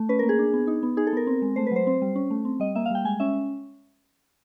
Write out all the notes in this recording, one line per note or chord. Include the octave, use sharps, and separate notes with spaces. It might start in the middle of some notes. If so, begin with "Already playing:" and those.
Already playing: A3
C#4 B4
A#4
A#3
G#4
D4
B3
D#4
B3
D#4 G#4
A4
B3 A#4
C4
G#3
A3 C5
B4
F#3 C5
C4
G3
C#4
A3
C4
G3 D#5
A#3 E5
F5
G3 G5
G#3 G#5
C#4 E5